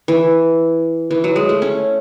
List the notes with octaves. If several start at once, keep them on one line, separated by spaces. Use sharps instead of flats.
E3
E3
F#3
G#3
A3
C#4